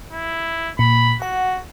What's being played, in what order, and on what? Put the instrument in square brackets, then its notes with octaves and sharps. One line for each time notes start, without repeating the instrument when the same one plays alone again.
[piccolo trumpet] E4
[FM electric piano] A#2 [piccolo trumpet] B5
[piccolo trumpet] F#4 [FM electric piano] F#5